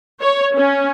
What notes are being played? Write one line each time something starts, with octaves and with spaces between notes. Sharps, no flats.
C#5
C#4